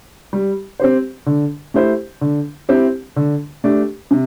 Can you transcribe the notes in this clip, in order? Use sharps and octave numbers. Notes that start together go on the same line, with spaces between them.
G3
C4 G4 C5
D3
A3 E4 G4 C5
D3
C4 E4 G4
D3
A3 D4 G4
C3